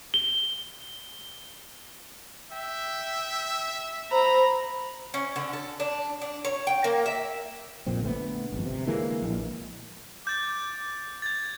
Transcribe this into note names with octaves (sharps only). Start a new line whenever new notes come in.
G7
E5 G5
C5 A#5 B5
C#4
D3
A4
D4
D4
C#5
G5
A#3
E5
A#1 F2 A#2 C4
D3 A3 B3
G#1 F2
C3
D3 E3 G#3 A#3
A#1
D6 G6 A6
G#6 A6